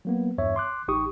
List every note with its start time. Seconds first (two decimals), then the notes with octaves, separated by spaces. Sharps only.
0.05 F#3 A#3 B3
0.38 E2 G2 C#5 E5
0.56 C6 D6 F#6
0.88 A1 D#4 G4 C#6 D#6